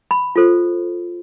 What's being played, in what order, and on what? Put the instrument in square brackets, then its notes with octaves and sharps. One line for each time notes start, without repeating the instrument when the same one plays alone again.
[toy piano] B5
F4 A4 C5